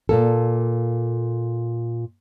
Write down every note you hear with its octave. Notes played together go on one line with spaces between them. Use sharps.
A#2 A#3 A4